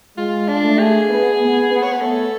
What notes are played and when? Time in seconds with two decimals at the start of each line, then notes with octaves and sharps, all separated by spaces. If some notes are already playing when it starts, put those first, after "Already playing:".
0.17 G#3 F4
0.48 D4
0.64 A3
0.79 G#4
1.09 B3
1.41 B3
1.71 B3
1.83 C#5
1.92 B4
2.02 A3 A4